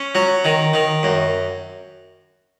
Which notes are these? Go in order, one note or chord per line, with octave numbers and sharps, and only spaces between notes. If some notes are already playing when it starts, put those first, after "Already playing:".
Already playing: C#4
F#3
D#3
D#3
F#2